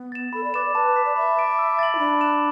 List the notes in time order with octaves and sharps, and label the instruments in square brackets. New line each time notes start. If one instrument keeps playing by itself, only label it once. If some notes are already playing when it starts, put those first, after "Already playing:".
Already playing: [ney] B3
[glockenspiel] A6 E7
[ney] A4 [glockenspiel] B5
[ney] D5
[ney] B4 [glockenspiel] D6 A6 E7
[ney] D5
[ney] B4 [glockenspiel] A5
[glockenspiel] D6 B6
[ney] D5
[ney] E5 [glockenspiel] B5
[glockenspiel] D6 A6 D7
E6
A6 D7 F#7
[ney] E4
[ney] D4 [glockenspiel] B5
[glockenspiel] F#6 A6 E7